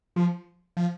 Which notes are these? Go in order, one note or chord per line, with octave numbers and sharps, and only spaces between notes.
F3
F3